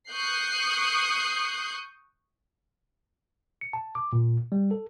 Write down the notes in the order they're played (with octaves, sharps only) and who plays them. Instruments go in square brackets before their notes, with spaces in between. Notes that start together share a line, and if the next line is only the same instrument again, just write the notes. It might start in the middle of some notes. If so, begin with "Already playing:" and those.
[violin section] C#6 D#6 F#6 G6 C7
[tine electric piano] C#7
A5
D6
A#2
G3
A4